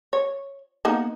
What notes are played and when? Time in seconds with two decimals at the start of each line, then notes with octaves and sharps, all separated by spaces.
0.13 C#5
0.85 A#3 B3 D#4